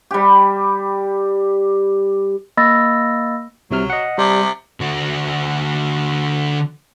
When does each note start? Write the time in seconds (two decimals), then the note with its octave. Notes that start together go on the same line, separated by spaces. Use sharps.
0.11 G3 G4
2.57 A#3 D#5 B5 E6 A6 A#6
3.71 C2 C3 F#3 F6
3.90 D#5 F#5
4.18 C3 G3
4.80 D3 F#4